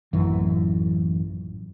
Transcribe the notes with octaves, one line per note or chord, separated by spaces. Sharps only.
A1 F#2 E3